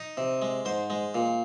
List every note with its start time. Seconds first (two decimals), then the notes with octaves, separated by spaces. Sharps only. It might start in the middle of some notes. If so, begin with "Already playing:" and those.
Already playing: D#4
0.17 C3
0.42 G#3
0.65 G#2 C5
0.90 G#3
1.15 A#2